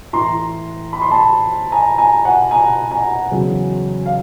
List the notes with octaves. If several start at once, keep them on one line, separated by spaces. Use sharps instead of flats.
A2 E3 A#5 C6
B5
C6
A5 B5
G#5 A#5
G#5 A#5
F#5 G#5
G#5 A#5
G#5 A#5
E2 C#3 F#3
F5